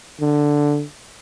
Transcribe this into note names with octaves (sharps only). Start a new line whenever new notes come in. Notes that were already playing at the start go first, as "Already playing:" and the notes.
D3